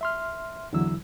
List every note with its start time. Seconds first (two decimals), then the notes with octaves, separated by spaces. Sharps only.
0.01 E5 C6 F6
0.73 E2 D3 E3 F#3 E4 E6